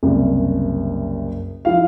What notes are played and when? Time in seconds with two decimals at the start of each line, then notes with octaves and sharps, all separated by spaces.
0.03 F#1 C2
1.65 F3 E4 F5